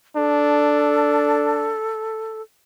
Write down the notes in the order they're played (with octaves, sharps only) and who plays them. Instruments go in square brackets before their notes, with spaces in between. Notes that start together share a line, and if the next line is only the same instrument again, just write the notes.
[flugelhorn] D4 [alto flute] A4